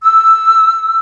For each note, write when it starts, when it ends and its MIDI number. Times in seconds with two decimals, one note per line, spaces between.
0.01 0.99 88